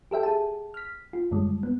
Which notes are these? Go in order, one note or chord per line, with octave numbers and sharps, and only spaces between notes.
G4 A4 E5 G5
G#4 A5
F6 B6
F4
F#2 D3 G3 G#3
B3